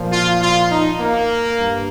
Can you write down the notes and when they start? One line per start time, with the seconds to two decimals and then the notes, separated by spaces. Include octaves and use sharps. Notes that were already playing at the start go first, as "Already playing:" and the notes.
Already playing: A#2 F3
0.13 F4
0.42 F4
0.71 D#4
1.00 A#3
1.58 G2